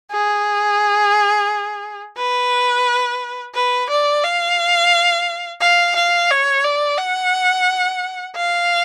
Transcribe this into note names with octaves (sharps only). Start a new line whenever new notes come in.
G#4
B4
B4
D5
F5
F5
F5
C#5
D5
F#5
F5